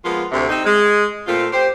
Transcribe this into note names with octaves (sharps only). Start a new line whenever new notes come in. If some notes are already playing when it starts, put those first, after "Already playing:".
F3 G#3 A#3 B3 F4
D2 C3
C4 D#4
G#3
A#2 A3 C4 F4
G4 C5